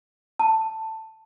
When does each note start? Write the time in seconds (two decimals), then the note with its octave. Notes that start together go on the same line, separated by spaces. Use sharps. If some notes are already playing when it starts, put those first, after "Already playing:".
0.39 A5